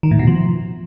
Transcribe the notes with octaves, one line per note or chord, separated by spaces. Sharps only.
D#3
A2
B2
F3